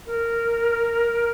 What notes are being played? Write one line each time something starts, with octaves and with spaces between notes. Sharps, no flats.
A#4